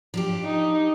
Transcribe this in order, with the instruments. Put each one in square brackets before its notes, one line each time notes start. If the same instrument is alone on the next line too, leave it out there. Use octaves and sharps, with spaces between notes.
[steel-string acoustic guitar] F3 D4 G4
[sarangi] D#4